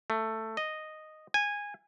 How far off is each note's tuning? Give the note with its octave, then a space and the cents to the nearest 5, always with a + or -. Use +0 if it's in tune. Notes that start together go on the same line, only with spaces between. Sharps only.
A3 +10
D#5 -5
G#5 -15